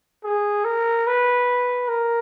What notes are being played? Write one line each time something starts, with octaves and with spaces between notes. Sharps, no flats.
G#4
A#4
B4
A#4